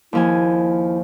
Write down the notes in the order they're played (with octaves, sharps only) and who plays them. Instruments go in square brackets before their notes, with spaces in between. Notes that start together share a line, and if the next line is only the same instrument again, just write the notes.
[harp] D#2 F3 G#5 [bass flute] E4